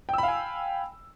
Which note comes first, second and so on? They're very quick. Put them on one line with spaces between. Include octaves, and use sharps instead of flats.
G5 E6 B5 F5 G#5